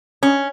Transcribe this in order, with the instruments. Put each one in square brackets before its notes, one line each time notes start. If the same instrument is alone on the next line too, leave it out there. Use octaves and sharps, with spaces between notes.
[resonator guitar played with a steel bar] C#4